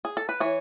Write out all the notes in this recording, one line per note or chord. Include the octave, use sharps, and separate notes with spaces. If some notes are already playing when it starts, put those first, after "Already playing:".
G#4
A4
B4
E3 C#5